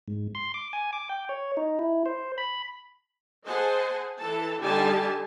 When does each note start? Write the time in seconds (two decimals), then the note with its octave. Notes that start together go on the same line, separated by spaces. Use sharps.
0.08 G#2
0.35 C6
0.54 D6
0.73 G#5
0.93 D6
1.09 G5
1.29 C#5
1.57 D#4
1.79 E4
2.06 C5
2.38 B5
3.46 G#4 C5 D#5 F#5 G#5 A5
4.18 E3 A4 A5
4.59 D3 G3 D#4 G4 G#5 A5